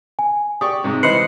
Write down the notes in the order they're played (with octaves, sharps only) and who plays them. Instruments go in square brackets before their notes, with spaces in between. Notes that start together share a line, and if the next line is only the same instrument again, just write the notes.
[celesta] G#5
[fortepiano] G4 D5 C#6 [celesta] D#6
[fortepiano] G#2 C3
[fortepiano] E3 C5 F#6 [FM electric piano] B4 D#5 [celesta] C7 C#7 F#7